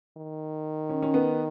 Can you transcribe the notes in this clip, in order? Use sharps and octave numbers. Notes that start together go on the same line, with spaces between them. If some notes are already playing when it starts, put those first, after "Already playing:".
D#3
C#4
C#4
B3